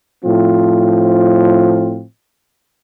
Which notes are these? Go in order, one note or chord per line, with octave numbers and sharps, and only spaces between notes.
A2 F3 C4 F4